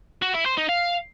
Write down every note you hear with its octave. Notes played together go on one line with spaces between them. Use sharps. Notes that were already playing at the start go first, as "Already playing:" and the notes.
F#4
E4
C5
D#4
F5